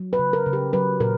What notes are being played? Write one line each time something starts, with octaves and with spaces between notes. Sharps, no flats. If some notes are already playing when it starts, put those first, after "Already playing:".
Already playing: F#3
B4
C#3
A#4
C#3
G4
F#3 B4
A#2 A#4